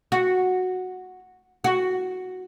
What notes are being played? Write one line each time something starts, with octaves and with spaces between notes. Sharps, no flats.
F#4
F#4